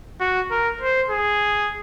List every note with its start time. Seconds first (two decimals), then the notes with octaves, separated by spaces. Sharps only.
0.20 F#4
0.51 A#4
0.81 C5
1.10 G#4